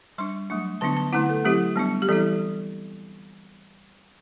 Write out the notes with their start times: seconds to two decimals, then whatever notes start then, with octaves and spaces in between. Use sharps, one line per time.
0.18 G3 D4 C6
0.50 F#3 A3 D4
0.81 D3 F#3 B3 D4 A5
0.97 A5
1.13 D3 A3 C4 E4 F#5
1.29 A4
1.45 F#3 A3 C4 E4 G4
1.76 G3 B3 D4
2.02 G4
2.08 E3 G3 C4 E4 A4